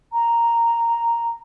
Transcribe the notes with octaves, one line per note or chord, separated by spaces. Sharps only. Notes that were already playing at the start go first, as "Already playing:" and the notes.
A#5